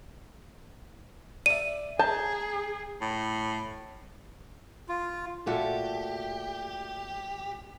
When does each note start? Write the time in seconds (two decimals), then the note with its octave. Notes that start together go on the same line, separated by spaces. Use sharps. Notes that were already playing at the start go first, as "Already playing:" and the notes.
1.46 D5 E5 D#7
1.99 G#4 A5 A#5 G6
3.01 A2
4.89 F4
5.47 A#2 A3 F#4 G4 A4 E5